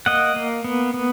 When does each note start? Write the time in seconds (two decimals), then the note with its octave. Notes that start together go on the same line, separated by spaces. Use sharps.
0.06 A#3 D#5 F#5
0.36 A#3
0.64 B3
0.94 B3